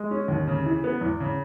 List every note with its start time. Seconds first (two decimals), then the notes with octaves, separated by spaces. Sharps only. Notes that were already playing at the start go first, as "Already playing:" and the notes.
Already playing: G#3
0.11 C#4
0.28 D#2
0.47 C#3
0.66 E3
0.84 B3
1.01 E2
1.20 C#3